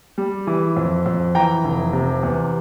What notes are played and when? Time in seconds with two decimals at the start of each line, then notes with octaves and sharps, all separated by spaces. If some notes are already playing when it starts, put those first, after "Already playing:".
0.18 G3
0.47 E3
0.77 F2
1.06 F2
1.35 E3 G5 A#5
1.64 F1
1.93 C3
2.23 E2